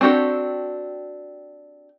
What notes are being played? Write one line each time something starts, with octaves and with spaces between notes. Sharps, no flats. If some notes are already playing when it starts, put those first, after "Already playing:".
C4 D4 F#4 G4 A4